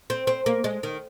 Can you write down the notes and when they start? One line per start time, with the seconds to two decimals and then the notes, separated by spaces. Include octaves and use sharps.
0.10 C4
0.27 C4
0.46 A#3
0.64 G#3
0.83 D#3